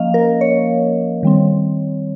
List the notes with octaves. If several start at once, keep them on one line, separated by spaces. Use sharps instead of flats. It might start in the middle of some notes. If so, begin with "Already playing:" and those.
Already playing: F3 A#3 C#4 D#5 F5
A#4
C#5
D#3 G3 C4